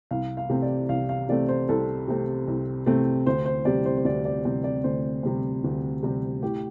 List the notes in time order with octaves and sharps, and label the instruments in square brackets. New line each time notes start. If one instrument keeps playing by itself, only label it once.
[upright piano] C2 F5
F5
C3 A3 C4
D5
C2 F5
F5
C3 A3 C4 D5
C5
C2 A4
C3 A3 C4
C2
C3 A3 C4
D2 C5
C5
C3 G3 C4 D5
C5
C5
D2 D5
D5
C3 G3 C4
D5
D2 C5
C3 G3 C4
D2
C3 G3 C4
A2 G4